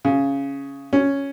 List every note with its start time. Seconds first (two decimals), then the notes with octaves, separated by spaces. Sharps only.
0.05 C#3
0.93 C#4